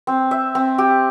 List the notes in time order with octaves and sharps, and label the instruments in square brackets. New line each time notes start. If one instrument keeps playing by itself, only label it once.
[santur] C4
E5
C4
G4